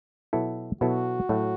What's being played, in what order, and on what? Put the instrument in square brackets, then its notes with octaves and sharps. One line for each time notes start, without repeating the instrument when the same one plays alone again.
[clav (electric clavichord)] B2 F#3 B3 E4 A4
[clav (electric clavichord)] B2 F#3 B3 E4 A4 [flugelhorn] F#4
[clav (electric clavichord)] A2 F#3 A3